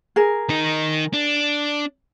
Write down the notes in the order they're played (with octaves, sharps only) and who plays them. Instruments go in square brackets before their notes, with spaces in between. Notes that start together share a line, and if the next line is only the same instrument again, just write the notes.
[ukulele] G#4 A#4
[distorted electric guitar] D#3 D#4
D4